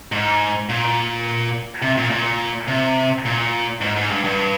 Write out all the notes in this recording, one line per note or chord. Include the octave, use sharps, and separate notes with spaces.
G#2
A#2
C3
A#2
A#2
C3
A#2
G#2
G#2
G2
G2